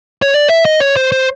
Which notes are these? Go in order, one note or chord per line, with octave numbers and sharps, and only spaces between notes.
C#5
D5
E5
D#5
C#5
C5
C5